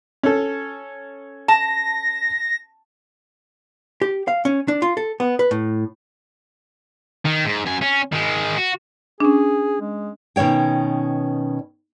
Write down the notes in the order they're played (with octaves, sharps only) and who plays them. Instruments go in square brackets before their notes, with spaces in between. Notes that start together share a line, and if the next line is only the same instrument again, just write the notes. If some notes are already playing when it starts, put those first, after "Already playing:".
[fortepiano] C#4 A4
[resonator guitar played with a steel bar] A5 [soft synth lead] A#6
[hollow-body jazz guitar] G4
F5
C#4
D4
F4
A4
B3
B4
A2
[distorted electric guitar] D#3
G#2
F#2 G#5
C#4
D#3 G#3
F#4
[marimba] C#4 D4 [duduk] G#4
[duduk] G#3
[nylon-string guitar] B2 D#3 C#4 C#5 G5